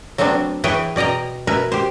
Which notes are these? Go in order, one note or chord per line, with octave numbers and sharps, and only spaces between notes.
F#3 A3 B3 C4 D4
E3 G#4 B4 C#5 E5 G5
B2 D5 D#5 G5 A#5
B2 A#4 B4 E5 G#5
G4 C5